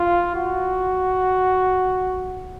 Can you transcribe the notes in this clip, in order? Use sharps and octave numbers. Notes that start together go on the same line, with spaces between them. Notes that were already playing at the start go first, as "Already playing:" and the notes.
Already playing: F4
F#4